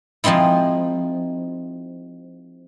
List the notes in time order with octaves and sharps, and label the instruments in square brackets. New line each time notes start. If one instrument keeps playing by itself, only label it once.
[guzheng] F3 G#3 C4 D#4 E4